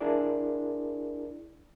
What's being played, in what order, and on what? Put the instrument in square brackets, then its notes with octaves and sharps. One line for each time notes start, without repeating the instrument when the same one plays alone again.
[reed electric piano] D4 E4 G#4 A#4 D5